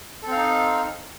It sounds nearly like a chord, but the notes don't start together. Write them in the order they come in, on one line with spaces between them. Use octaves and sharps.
A4 C4 F5 D#4